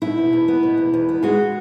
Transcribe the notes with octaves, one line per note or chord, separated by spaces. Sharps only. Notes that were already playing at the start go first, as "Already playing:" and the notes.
B2 E4
E2
E2
B3
B2
E2
E2
B3
G#3 F#4